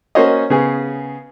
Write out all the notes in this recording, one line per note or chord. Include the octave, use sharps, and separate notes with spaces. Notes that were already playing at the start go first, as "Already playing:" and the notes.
A#3 C#4 F#4 C5 C#5 D#5
C#3 B3 G#4